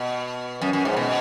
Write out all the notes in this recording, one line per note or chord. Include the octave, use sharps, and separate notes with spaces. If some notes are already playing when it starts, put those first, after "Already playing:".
Already playing: B2
F#2
F#2
G#2
B2